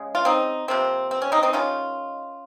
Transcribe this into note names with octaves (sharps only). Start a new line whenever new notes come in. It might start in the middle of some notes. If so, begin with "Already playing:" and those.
Already playing: C#3 G#3
F4
C4 D#4
C3 F3 A#3 C4
C4
C#4
C4 D#4
C4 D#4
D#3 G#3 C#4 F4